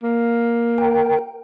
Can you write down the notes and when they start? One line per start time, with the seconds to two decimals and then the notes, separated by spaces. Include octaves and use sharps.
0.03 A#3
0.78 A#4 G5